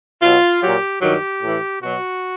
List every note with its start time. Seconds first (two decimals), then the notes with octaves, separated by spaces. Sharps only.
0.22 B2 F#3 F4
0.62 A#2 F#3 G4
1.01 G2 D#3 F#3 G4
1.42 A2 E3
1.82 B2 F#3 F#4